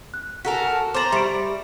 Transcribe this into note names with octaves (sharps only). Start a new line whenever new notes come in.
F#6
F#4 A4 A#4 G#5 A#5 B6
A5
C5 A#5 D6 A6 F#7
G3 E5 C#6 D7